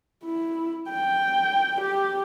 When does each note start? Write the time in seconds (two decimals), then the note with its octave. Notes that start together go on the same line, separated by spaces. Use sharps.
0.23 E4
0.90 G5
1.81 G4